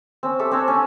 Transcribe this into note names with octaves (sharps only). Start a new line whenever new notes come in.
C4 C#4
G4 A4 E5
C4 D4 C#5
C#4